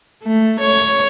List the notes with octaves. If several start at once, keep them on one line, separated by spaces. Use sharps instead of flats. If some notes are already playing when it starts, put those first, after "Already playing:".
A3
C#5